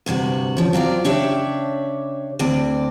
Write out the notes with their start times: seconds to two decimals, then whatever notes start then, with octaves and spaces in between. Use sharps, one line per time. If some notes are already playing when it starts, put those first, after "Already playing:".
0.06 D2 G2 C3 F#4
0.57 C#3 F3
0.73 F#3 C4 F4 D5
1.04 C#3 D4 G4 C#5 E5
2.39 D2 C4 D5